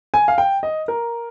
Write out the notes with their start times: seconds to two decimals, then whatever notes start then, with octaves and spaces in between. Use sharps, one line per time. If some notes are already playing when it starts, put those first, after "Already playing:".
0.14 G#5
0.28 F5
0.38 G5
0.63 D#5
0.88 A#4